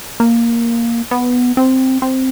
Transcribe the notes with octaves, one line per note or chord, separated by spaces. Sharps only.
A#3
B3
C4
C4